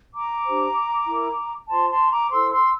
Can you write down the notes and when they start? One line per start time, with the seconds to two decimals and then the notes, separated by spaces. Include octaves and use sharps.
0.13 A#5 D6
0.45 D4 G4 C5
1.06 E4 A#4
1.69 F4 C5 A5 C6
1.90 A5 C6
2.10 A#5 D6
2.30 E4 A4 C5 C6 E6
2.52 C6 E6